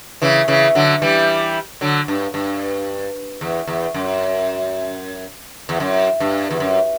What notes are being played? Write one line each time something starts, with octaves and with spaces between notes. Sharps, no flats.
C#3 E3
C#3 E3
D3 F#3
E3 G3
D3 F#3
G2
G2
E2
E2
F#2
E2
F#2
G2
E2
F#2